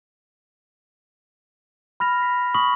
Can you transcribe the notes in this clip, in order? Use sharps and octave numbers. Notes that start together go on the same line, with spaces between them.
B5 F6 A#6 F7
B6
B5 C#6 D#6 B6 F#7